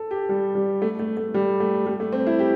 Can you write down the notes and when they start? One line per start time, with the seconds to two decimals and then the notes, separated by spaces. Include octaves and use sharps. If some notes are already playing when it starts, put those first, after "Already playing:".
Already playing: A4
0.11 G4
0.29 G3
0.55 G3
0.82 A3
0.99 A3
1.17 A3
1.34 G3
1.60 A3
1.87 G3
2.00 A3
2.12 C4
2.27 E4
2.39 G4